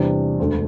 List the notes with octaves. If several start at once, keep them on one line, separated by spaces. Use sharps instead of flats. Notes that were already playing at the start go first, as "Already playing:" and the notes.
Already playing: E2 C3 G3 D4
E1 D2 D3